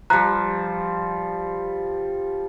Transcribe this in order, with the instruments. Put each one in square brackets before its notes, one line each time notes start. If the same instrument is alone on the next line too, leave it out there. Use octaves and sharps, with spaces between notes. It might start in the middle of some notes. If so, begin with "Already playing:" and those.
[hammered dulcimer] F3 G3 [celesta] A#5 F#6